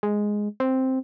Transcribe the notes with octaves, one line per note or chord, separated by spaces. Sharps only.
G#3
C4